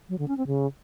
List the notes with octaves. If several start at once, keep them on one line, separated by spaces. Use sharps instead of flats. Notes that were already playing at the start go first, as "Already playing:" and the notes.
F#3
D3
C#4
C4
C#3